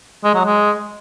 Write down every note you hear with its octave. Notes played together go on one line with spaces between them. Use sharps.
G#3
F#3
G#3